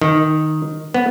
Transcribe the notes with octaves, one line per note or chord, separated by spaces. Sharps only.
D#3
B3